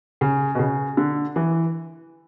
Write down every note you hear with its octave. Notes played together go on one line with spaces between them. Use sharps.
C#3
B2
C#3
D3
E3